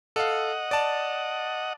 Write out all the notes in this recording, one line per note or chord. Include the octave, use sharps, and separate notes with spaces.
A4 D#5 F5 F#5
D5 A5